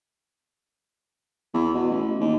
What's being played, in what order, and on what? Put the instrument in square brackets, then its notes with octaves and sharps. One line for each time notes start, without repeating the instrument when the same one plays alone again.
[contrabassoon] E2
B2
A1
D#2